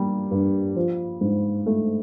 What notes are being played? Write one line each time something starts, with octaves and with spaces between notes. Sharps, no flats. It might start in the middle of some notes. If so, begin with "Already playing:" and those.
Already playing: G3 A#3
G2
F3
G#2
A3